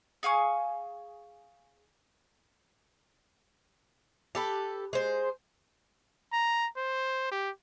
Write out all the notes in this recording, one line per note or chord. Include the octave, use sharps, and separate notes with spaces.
G#4 F5 G#5 C#6
G4 A4 B4
G#3 C5
A#5
C5
G4